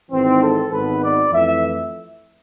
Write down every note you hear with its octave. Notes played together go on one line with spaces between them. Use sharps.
G#1 G#2 E3 C4
A4
G#1 G#2 G#3 B3 B4
D5
F2 E3 A3 E5